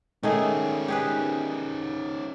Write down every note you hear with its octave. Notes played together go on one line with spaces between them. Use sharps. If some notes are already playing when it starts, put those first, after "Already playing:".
D#3 A3 C#4 D#4 G#4
G4 G#4 B4